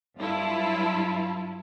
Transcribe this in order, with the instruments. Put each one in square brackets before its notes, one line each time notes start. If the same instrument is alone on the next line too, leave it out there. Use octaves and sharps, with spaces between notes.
[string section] G2 F#3 E4 F4 A5